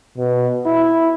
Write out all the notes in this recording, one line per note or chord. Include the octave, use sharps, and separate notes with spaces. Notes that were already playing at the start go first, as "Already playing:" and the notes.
B2
E4